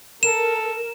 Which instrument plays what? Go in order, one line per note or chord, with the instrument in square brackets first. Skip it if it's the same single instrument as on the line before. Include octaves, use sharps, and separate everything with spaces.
[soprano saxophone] A4 [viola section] A#4 [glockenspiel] E7